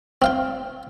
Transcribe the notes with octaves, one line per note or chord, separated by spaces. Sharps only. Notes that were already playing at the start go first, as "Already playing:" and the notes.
C4 F5 G5